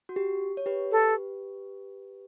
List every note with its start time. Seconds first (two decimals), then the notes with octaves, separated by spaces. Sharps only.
0.09 F#4
0.16 G4
0.57 C#5
0.66 G4 B4
0.92 A4